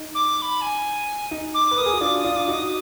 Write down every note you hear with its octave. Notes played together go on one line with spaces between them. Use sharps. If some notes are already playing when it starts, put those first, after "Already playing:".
Already playing: D#4
D6
D6
B5
G#5
D#4
D6
B4
A#4 D#6
G#4
F#4
D4 F4 D6
D#6
D4 F4
D6
D#4 F#4
D#6